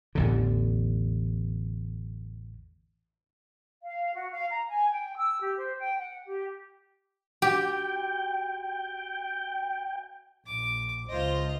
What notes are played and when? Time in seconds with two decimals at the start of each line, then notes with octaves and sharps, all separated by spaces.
0.15 A1 E2 D3
3.82 F5
4.14 F#4
4.32 F5
4.50 A#5
4.68 G#5
4.91 G5
5.17 E6
5.41 G4
5.57 C5
5.78 G5
5.98 F#5
6.27 G4
7.42 F#4 G4 G5
10.47 A#1 D6
11.09 C#2 F4 C5 D#5